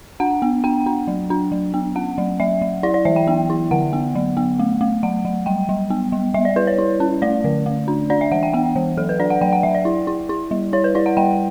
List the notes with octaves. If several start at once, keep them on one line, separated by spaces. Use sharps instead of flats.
D4 F#5
B3
D4 G5
D4
F#3
D4
F#3
B3
C#4 F#5
F#3
F#3 E5
F#3
E4 D5
D5
E3 E5
G5
B3
E4
D3 F#5
B3
F#3
B3
A3
A3
F#3 F#5
F#3
G3 G5
G3
B3
G3
G3 E5
D5
E4 B4
C#5
E4
C#4
A3 D5
D3
A3
D4
D4 D5
E5
E3 F#5
G5
B3 G5
E3
F#3 A4
B4
D4 D5
F#5
F#3 G5
F#5
F#3 E5
D5
E4
E4
E4
G3
E4 C#5
B4
E4 D5
F#5
G3 G5